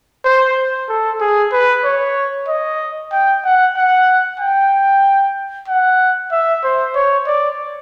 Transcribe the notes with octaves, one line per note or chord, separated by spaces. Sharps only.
C5
A4
G#4
B4
C#5
D#5
G5
F#5
F#5
G5
F#5
E5
C5
C#5
D5